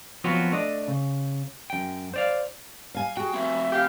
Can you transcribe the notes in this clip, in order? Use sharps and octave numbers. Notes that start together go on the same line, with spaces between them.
F3 F#3 B3 C4 F4 F#4
A3 D4 D#5
C#3
F#2 G5
C5 D5 F5
F5 G#5
F#4 G#4 G5
A3 C4 E5
G4 F5